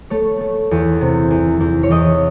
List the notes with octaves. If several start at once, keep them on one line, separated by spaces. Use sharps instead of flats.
A3 C#5
A3
E2
C3
E2
E2
C#5
E2 D#5